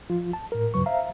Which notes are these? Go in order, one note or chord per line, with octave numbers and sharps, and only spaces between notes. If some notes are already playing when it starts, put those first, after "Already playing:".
F3 F4
A5
A2 A#4
D2 G2 C#3 F#3 B4 C#6
C5 E5 F5 A#5